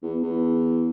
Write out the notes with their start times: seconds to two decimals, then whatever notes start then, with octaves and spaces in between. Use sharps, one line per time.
0.03 E2
0.23 E2